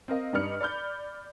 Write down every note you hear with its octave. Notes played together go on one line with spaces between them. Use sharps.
C4 A#4 D#5 F5
G2 G3 D#4 F6 C#7
D5 B5 F6 G6